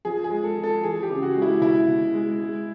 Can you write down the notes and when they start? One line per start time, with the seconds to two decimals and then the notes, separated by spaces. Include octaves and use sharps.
0.05 F3 G#4
0.24 G#4
0.31 G#3
0.44 A4
0.57 F3
0.64 A4
0.83 E3 G#4
1.03 G4
1.10 C#3
1.22 F#4
1.35 G#3
1.42 E4
1.61 B2 E4
1.88 B2
2.14 G#3
2.40 G#3